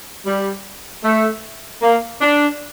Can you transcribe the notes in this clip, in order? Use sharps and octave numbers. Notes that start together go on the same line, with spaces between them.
G3
A3
A#3
D4